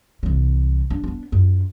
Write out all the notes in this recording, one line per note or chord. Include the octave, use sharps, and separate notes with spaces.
C2 E3
D4
B3 D4
F#2 F4